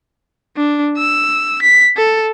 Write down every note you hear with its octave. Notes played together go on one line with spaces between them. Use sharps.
D4
E6
B6
A4